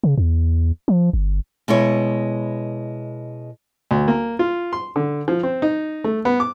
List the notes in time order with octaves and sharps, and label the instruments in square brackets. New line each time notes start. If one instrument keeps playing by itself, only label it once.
[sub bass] C#3
E2
F3
G1
[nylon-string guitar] B2 G#3 E4 C#5
[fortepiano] D2
A#3
F4
C6
D3
F3
C4
D#4
A3
B3
D6